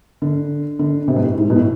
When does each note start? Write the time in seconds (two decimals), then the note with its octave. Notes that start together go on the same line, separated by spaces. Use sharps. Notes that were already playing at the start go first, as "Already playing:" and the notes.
0.22 D3
0.79 D3
1.08 C3
1.16 B2
1.23 A2
1.38 G#2
1.50 B2
1.56 A2